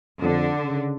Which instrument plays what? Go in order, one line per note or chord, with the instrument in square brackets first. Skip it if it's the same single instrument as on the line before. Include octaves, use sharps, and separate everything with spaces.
[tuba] F2 [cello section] D3
[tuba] C#3